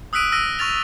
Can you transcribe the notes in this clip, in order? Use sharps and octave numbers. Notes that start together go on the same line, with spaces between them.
D#6 E6 F#6 B6 D7 D#7
E6 F6 A#6 D#7
C#6 F6 A6 F7